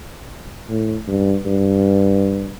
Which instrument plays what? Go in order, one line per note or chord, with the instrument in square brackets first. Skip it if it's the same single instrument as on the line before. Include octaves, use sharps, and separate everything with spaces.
[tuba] A2
G2
G2